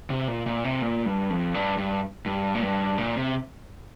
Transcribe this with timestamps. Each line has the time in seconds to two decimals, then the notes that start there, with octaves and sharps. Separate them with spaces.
0.10 C3
0.28 A#2
0.46 A#2
0.64 C3
0.82 A#2
1.06 G2
1.30 F2
1.54 G2
1.78 G2
2.26 G2
2.55 A#2
2.62 G2
2.98 A#2
3.16 C3